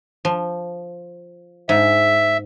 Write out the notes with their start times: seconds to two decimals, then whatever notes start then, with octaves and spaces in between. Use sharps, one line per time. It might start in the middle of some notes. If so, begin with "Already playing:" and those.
0.25 F3
1.69 G#2 E5